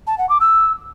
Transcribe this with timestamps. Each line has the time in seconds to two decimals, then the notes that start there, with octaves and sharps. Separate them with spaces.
0.07 A5
0.18 F#5
0.29 D6
0.40 E6